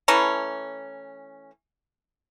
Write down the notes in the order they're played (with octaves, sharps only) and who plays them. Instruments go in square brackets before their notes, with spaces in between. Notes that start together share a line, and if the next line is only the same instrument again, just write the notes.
[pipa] E3 A3 C#4 A#5